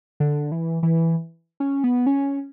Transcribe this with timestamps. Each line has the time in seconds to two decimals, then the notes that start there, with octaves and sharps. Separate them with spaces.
0.20 D3
0.52 E3
0.83 E3
1.60 C#4
1.84 B3
2.06 C#4